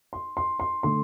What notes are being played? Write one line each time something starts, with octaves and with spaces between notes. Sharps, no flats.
C6
C6
C6
D3 A3 C6